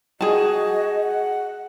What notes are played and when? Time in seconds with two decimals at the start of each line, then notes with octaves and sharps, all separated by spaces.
0.21 F#4 G#4 D#5 A5
1.04 F#5